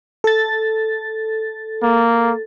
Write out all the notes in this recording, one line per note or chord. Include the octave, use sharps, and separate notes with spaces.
A4 A6
A#3